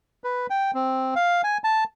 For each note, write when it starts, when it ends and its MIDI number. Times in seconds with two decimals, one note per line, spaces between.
0.24 0.47 71
0.50 0.71 79
0.74 1.14 60
1.16 1.42 77
1.44 1.58 80
1.64 1.84 81